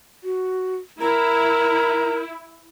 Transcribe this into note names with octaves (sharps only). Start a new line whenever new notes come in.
F#4
E4 A#4 A#5